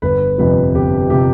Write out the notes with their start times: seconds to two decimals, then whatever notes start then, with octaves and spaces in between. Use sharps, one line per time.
0.02 G1 B4
0.38 F2 C3 F3 B4
0.75 G1 G4
1.10 C3 F3 G4